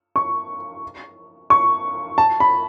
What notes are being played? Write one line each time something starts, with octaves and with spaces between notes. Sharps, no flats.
C#6
C#6
A5
B5